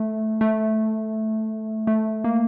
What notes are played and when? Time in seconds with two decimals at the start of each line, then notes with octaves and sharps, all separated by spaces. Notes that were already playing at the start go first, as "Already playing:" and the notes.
Already playing: A3
0.41 A3
1.87 A3
2.24 A#3